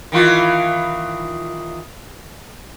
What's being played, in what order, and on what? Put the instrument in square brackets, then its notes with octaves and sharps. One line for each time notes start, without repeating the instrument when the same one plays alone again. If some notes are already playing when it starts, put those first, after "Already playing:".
[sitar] D#3 E3 F4